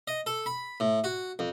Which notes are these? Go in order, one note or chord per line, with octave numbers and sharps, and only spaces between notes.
D#5
A4
B5
A2
F#4
F2